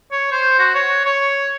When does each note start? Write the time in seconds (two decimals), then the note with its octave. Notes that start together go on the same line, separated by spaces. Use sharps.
0.12 C#5
0.32 C5
0.59 F#4
0.75 C#5
1.05 C#5